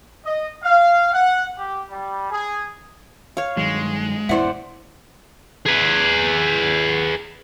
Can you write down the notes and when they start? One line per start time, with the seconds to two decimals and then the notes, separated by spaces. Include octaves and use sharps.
0.25 D#5
0.63 F5
1.13 F#5
1.58 G4
1.90 G3
2.30 G#4
3.37 C#5 F5
3.57 G2 D#3 F#3 G#3
4.29 A1 F2 B2 E4 C5 D5 E5 F#5
5.66 G#4 B4